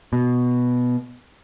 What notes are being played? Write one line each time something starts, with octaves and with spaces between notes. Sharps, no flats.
B2